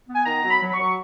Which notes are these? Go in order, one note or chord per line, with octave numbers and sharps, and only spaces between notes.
B3
G#5
D#3 A#5
F#3
B5
F#3
B5
F#3 C#6